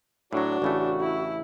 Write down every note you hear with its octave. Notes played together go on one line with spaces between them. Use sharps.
A2 F#3 D4 F#4
A1 C#3 A3
E4